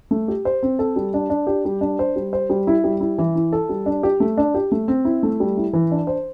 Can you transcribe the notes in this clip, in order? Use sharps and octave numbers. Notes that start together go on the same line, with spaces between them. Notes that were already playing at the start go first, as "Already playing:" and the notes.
A3
G4
C5
C4
A4
G3
D4
D4
G4
G3
D4
C5
G3
C5
G3
E4
G3
E4
E3
E4
A4
G3
D4
G4
A3
D4
G4
A3
C4
E4
A3
G3
E4
E3
D4
C5